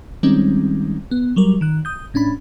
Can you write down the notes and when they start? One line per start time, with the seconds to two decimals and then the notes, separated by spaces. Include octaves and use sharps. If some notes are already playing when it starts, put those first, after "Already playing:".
0.23 D#3 G3 G#3 C4 C#4 D#4
1.11 B3
1.36 F#3 G3 A#4
1.61 D#3 F#6
1.85 D#6 G6
2.14 A2 C#4 D4 B5